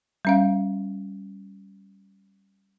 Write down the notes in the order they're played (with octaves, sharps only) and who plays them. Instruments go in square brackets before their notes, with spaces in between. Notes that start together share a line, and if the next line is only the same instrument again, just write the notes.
[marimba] G3 C#4 F5